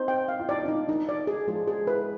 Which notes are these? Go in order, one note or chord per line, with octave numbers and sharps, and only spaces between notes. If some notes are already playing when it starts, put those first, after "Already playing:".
Already playing: C4 D#4 C5
G5
F5
F4
D#4 D5
D4 F4
D#4
D#4
D5
G#4
F3 G#3 G#4
G#4
B4